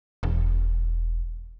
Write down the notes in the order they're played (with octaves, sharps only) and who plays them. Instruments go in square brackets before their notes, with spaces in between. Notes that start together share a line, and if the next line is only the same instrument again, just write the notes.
[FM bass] E1